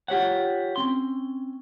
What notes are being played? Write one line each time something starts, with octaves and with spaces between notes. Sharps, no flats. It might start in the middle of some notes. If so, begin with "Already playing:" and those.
F4 G4 C#5 F#5
C4 C#4 C6